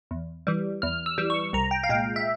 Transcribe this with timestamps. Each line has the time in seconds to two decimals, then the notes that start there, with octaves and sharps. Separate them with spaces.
0.11 E2
0.47 E3 G3
0.82 E2 F6
1.06 E6
1.18 E3 G3
1.30 C#6
1.53 C2 A#5
1.71 G5
1.84 F5
1.89 A#2 G#3 G5
2.16 E5